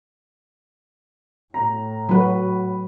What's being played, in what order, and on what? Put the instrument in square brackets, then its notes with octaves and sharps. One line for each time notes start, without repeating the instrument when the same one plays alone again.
[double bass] A2 [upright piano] A#5
[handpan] F#3 F#4 [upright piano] B4 B5